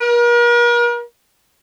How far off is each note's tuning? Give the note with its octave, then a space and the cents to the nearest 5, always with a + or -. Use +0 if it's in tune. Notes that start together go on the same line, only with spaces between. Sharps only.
A#4 +40